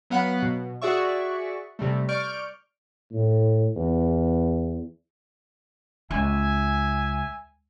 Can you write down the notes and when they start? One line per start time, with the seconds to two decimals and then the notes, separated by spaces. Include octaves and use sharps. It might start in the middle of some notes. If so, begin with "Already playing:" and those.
0.10 F#3 B3 F5 F#5 B5 F#6
0.42 B2
0.82 F#4 G#4 D5 E5 C#6
1.79 C3 G3 A3
2.09 D5 C#6 F6 G6 D7
3.13 A2
3.76 E2
6.11 C#2 E5 G#5